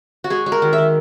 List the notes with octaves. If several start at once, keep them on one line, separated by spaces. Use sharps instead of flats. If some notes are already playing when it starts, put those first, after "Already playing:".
F#4
G#3 G#4
G#3
A#4
D#3
E5
D#3